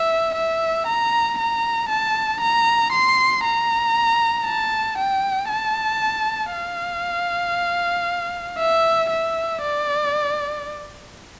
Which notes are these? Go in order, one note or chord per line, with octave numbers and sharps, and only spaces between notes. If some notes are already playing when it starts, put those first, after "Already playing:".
Already playing: E5
E5
A#5
A#5
A5
A#5
C6
A#5
A5
G5
A5
F5
E5
E5
D5